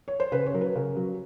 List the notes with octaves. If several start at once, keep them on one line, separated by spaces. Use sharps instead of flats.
C#5
C5
C#3 B4
C#5
F#3 A#4
B4
C#3 A#4
F#3